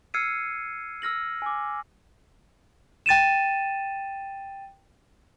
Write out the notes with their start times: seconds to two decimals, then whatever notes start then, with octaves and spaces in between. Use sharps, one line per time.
0.14 E6 F6 G#6 C7 C#7 D#7
1.02 E6 F6 A#6 F#7
1.42 G#5 D6
3.06 G5 A6 D#7 E7